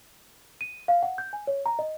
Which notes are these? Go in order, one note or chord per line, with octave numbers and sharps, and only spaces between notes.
D#7
F5
F#5
G6
G#5
C#5
A#5
D#5